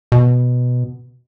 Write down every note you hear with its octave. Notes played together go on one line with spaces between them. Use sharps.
B2